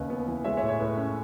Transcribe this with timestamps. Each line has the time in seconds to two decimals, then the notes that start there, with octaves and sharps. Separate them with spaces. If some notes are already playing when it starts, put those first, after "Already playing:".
Already playing: D#2 C#3 B4 D#5
0.10 B3
0.27 E3
0.44 G#3 C#5 E5
0.57 C#5 E5
0.63 A2
0.68 C#5
0.80 A2 B4
0.97 C#4